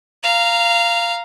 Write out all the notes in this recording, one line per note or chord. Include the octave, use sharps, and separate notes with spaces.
F5 A#5